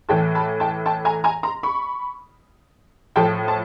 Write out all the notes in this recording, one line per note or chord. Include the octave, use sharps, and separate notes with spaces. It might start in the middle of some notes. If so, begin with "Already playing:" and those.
A2 E3 A3 G5 A5
A5 B5
G5 A5
G5 A5
G#5 A#5
G#5 A#5
A#5 C6
B5 C#6
A2 F3 A3 G5 A5
A5